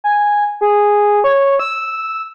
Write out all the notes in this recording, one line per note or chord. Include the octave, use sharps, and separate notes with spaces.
G#5
G#4
C#5
E6